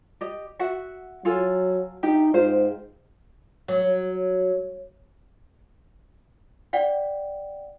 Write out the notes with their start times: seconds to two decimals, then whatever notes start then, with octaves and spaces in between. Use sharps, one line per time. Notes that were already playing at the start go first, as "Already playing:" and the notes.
0.21 G4 D#5
0.59 F#4 E5 F#5
1.25 F#3 F4 A4 G#5
2.03 D#4 G4 E5
2.34 G#2 F4 G4 C5
3.68 F#3
6.73 D5 F#5 G5